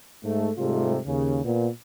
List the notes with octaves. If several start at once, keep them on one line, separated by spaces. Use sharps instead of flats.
G#2 A3
G#2 C3 G3 A3 F4
D#2 C#3
A#2 B3